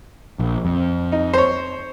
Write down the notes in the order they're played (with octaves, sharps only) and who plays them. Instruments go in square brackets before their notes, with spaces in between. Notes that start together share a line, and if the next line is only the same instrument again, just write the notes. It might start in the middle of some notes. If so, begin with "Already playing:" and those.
[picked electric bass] A#1
F2
[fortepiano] D#4
C5 C#5